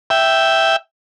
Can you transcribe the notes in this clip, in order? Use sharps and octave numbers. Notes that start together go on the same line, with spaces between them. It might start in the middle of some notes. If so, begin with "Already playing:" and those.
E5 G5